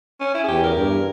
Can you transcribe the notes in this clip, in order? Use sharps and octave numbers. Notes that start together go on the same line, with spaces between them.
C#4
E4
G#4
E2 G4
A#4
G2